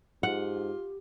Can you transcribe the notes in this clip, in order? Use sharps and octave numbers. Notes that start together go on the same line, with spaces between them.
G#2 F4 G4 F#5